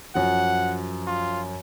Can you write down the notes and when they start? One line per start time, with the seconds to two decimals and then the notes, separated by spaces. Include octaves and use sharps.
0.15 F#2 F3 F#5
1.07 F4